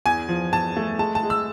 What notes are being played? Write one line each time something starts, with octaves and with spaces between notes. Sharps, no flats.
E2 G#5
F3
E2 A5
A3
G#3 A5
A5
G#3
E6